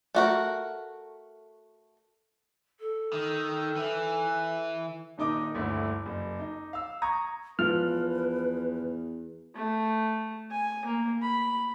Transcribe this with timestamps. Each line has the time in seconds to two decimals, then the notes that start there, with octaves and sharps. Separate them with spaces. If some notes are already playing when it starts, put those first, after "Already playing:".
0.15 A3 F#4 A#4
2.80 A4
3.13 D#3
3.76 E3
5.18 D#1 D#3 D#4 D6 D#6
5.55 G1 D2 E4
6.06 F#1
6.39 D#4
6.73 F5 E6
7.02 A#5 C#6 D#6 G#6 A#6
7.59 E2 F3 B4 F6
9.55 A3
10.51 G#5
10.86 A#3
11.21 B5